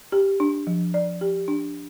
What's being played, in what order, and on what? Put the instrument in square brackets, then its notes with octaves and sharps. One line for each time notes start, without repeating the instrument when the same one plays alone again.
[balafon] G4
D4
F3
D5
G4
D4